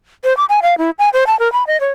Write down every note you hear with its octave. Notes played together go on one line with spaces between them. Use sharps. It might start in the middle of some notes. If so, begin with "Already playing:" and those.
C5
D6
G#5
F5
E4
G#5
C5
A5
A#4
B5
D#5
C#5